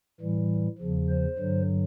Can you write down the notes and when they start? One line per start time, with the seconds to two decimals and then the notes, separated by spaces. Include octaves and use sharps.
0.21 A2 E3 G3
0.79 E2 C#3 F3
1.09 C5
1.38 G2 D3 F#3